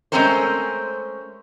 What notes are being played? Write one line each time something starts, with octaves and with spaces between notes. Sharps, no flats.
G#3 A3 C4 C#4 A#4 C5